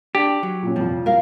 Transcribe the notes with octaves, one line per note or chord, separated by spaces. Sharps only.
D4 G4
F#3
A#2 C#4
C2 F2 A#2 F3
C2 A#4 F5